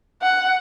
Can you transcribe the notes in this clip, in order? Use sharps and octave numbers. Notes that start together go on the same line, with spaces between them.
F#5